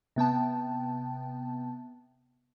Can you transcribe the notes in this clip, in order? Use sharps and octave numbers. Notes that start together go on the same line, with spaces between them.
C3 B3 G5 A5